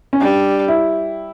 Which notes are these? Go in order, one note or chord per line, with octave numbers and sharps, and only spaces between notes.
C#4
G3 D4
E4